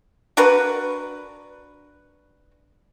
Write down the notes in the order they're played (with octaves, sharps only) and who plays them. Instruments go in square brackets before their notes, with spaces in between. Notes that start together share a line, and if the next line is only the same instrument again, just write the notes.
[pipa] D4 F#4 A#4 B4